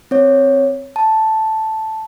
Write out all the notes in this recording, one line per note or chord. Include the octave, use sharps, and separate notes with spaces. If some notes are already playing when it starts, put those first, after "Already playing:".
C4 C#5
A5